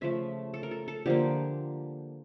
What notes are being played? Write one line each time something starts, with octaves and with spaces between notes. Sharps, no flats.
C#3 F3 A3 E5
A4
A#4
A4
A4
D3 F3 A#3 G4